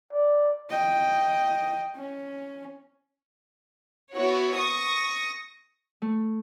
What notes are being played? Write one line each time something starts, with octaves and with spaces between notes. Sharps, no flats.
D5
D#5 G5
C#4
B3 E4 F#4 C#5
C#6 D#6 A#6
A3